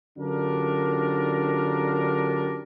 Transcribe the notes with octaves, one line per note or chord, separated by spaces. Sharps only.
F#2 D3 D4 F4 G4 A#4